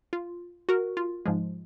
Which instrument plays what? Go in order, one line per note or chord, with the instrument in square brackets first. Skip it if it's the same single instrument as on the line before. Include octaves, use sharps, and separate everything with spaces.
[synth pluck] F4
F#4 A#4
F4
G#2 F3 G#3